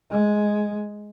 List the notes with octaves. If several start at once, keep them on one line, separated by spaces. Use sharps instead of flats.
G#3